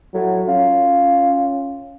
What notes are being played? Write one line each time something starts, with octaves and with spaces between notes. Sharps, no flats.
A2 F#3
C#4 F4